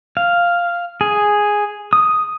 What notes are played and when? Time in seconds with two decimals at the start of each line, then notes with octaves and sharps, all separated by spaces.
0.17 F5
1.01 G#4
1.93 D#6